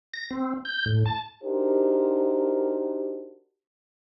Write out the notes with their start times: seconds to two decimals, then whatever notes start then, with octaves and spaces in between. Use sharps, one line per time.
0.14 A#6
0.31 C4
0.65 G6
0.86 A2
1.06 A5
1.44 D4 D#4 F#4 G4 A#4 C5